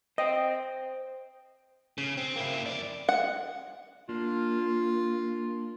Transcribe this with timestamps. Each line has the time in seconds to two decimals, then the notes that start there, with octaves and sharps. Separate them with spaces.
0.18 C5 D#5 G5
1.98 C#3
2.17 C4
2.36 A#3 E4
2.66 F2 D5
3.09 F#5
4.09 A#3 D4 F4